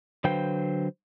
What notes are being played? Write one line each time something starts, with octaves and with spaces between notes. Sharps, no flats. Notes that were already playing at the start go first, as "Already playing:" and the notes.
D3 F#3 B4 C5 F5 G5